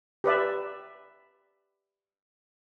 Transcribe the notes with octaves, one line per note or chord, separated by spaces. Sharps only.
G4 B4 D5 E5